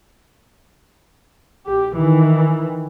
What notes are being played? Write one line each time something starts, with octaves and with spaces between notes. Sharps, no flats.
B1 G4
D#3 E3